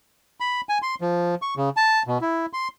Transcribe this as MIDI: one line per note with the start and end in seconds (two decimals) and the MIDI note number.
0.40 0.61 83
0.69 0.78 80
0.82 0.95 84
1.01 1.35 53
1.42 1.54 85
1.57 1.69 49
1.77 2.03 81
2.07 2.18 47
2.21 2.46 64
2.53 2.68 84